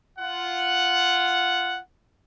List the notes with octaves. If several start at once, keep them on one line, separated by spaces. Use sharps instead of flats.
F4 F#5